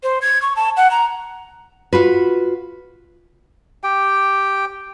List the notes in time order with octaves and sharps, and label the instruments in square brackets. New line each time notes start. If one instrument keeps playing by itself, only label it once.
[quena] C5
G#6
C#6
A5
F#5
A#5
[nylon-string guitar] F4 F#4 B4
[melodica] G4 G5